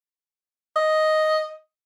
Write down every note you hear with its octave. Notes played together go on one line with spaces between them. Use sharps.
D#5